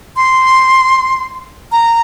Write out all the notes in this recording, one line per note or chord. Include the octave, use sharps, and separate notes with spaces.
C6
A#5